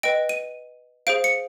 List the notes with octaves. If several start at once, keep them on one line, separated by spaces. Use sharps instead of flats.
B4 D#5 G5 D7
D#7
G#4 C5 F5 D7
C#7